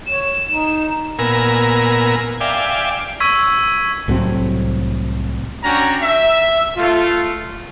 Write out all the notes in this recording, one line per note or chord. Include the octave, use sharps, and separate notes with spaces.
C#5 E7
D#4
A#2 B3 A#4 G#5 A#5 E6
D5 E5 F5 G5 G#5 D6
C#6 E6 G#6 B6
C2 A2 F#3 C4
C#4 D4 F#4 G5 A#5
E5
A3 F4